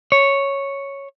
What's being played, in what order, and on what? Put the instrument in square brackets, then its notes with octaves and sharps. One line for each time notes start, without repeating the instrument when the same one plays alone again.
[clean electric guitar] C#5